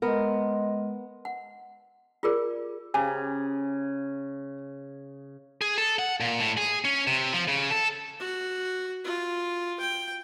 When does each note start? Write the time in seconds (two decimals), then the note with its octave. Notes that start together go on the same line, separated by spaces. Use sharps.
0.02 G#3 B3 A#4
1.25 F#5
2.23 F4 G4 G#4 A#4 D5
2.94 C#3 G4 G#5 A#5
5.61 G#4
5.78 A4
5.99 F#5
6.20 A#2
6.40 A2
6.57 G#4
6.85 C#4
7.07 C3
7.33 F3
7.48 C#3
7.70 A4
8.20 F#4
9.05 F4
9.80 G5